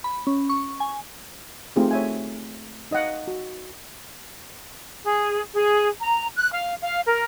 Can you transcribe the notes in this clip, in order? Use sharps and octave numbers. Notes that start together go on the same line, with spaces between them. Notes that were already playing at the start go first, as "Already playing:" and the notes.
B5
C#4
C#6
G#5
A3 C4 D#4 F4 G4 G#4
C#5 E5 G#5
D#4 D#5 F5 F#5
F#4
G#4
G#4
A#5
F#6
F5
F5
A#4